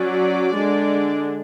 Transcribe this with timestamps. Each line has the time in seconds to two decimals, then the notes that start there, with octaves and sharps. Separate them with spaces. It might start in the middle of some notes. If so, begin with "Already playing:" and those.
Already playing: F#3 C#4 D5
0.55 D3 G#3 D4